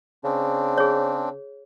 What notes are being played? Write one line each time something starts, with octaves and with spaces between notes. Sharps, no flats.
C#3 C4 D4
G#4 C#5